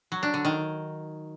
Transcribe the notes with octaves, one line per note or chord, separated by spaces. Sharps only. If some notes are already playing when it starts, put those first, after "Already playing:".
F#3
D4
D3
D#3